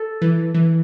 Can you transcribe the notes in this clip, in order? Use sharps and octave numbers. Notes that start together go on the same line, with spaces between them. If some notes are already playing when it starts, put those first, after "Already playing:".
Already playing: A4
E3
E3